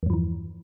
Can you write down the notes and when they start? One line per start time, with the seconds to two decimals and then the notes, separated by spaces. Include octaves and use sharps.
0.03 E2
0.06 G2
0.10 F3
0.13 E3